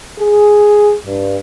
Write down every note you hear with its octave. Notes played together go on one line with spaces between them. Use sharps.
G#4
G2